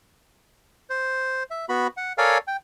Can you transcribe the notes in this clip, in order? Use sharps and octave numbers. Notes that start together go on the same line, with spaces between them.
C5
E5
B3 F#4 B5
F#5
A4 A#4 C#5 D5 F5 G#5
G5